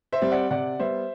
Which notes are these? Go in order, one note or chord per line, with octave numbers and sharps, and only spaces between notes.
C5 E5
G3 C4
D5 F#5
C3 D5 F#5
G3 B3 C5 E5